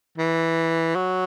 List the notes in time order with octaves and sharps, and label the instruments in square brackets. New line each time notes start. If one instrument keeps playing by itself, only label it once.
[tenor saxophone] E3
F#3